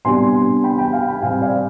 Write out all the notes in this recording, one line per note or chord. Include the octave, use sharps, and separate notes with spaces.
C3 G3 B3 D4 G#5 C6
G5 B5
G5 B5
F5 G#5
G5 B5
C3 G3 C4 F5 G#5
D5 F5